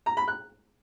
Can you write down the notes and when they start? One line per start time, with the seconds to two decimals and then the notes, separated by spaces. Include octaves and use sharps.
0.06 A#5
0.17 B5
0.28 F#6